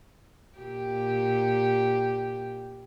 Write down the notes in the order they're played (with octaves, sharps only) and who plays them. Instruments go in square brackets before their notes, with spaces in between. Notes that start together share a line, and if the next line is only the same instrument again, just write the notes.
[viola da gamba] A#2 G4